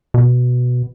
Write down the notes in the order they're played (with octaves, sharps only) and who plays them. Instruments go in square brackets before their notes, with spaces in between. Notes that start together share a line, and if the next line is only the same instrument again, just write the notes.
[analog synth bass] B2